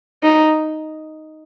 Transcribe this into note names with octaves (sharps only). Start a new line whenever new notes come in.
D#4